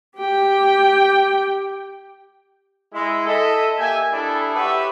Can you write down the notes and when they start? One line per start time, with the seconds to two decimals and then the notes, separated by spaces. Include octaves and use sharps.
0.17 G4 G5
2.93 G#3 E4
3.26 A4 D#5 E5
3.77 A#3 G4 E5 G#5
4.12 G3 D4 E4 G#4 A4
4.55 G4 B4 C#5 E5 F#5